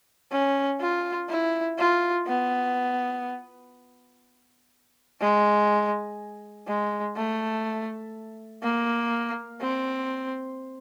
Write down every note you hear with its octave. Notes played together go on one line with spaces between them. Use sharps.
C#4
F4
E4
F4
B3
G#3
G#3
A3
A#3
C4